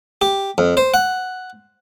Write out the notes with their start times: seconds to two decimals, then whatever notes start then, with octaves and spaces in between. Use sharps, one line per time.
0.21 G4
0.58 F2
0.77 C5
0.94 F#5